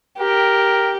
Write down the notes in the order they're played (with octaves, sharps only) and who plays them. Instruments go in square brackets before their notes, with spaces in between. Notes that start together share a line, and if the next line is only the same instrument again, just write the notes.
[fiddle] G4 [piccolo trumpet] A#4